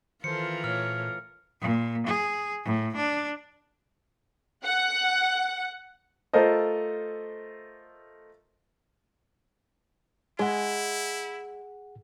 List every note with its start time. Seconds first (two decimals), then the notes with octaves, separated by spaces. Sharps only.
0.24 D#3 E3 F4 A4 A#4 C5 C#7
0.64 A#2 A3 C#5 F6
1.61 A#2
2.07 G#4
2.64 A2
2.96 D4
4.65 F#5
6.33 A3 F4 A4 A#4 C5 D#5
10.39 G#3 E4 G#4 F#5